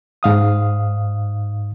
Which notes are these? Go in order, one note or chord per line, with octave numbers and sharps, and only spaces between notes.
G#2 F5 D#6